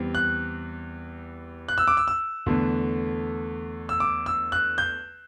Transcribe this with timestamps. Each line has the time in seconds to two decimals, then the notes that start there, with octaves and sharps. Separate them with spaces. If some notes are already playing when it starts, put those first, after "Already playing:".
Already playing: E2 G3 C4
0.15 F#6
1.68 F#6
1.78 E6
1.88 D6
1.97 E6
2.08 E6
2.46 E2 D3 A3
3.89 E6
4.00 D6
4.26 E6
4.52 F#6
4.78 G6